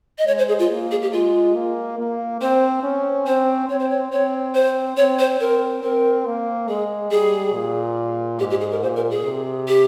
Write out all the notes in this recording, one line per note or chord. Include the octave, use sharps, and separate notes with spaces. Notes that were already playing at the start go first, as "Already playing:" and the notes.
D#5
G#3 C#5
C5
G#4
F4
A#3
G#4
G4
G#3 F4
A#3
A#3
C4 C5
C#4
C4 C5
C4 C#5
C5
C#5
C4 C#5
C5
C4 C#5
C5
C4 A#4
C4 A#4
A#3
G#3 G#4
G3 G#4
A#2
G#2 G4
G4
G#4
A#4
A#2 C5
A#4
G#4
C3
G4